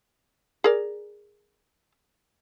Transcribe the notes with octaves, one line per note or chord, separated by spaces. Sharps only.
G#4 A#4 D5